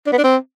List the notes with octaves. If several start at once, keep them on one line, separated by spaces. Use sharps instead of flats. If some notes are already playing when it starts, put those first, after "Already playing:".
D4
B3
D4
C4